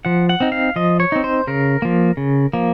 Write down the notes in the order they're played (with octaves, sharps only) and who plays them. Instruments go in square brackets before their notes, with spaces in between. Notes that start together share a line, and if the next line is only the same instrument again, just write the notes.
[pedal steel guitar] F3 F#5
F#5
C4 D#4
F5
F3 D#5
C#5
C4 D#4
C5
C#3 A#4
F3 A#3
C#3
F3 A#3